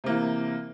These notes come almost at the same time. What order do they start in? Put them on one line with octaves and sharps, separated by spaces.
C3 A#3 E3